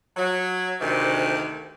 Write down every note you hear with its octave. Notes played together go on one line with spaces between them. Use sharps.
F#3
D2 C3 D#3